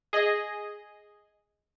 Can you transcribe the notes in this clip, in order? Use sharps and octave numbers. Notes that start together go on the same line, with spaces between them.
G#4 D#5